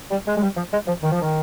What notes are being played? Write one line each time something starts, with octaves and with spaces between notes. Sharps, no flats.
G3
G#3
G#3
G3
F3
G#3
F3
D#3
F3
D#3